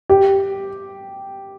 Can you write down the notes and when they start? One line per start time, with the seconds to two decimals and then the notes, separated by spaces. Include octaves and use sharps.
0.10 G4